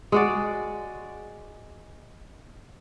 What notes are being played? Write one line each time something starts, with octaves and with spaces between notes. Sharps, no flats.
G#3 F#4 D5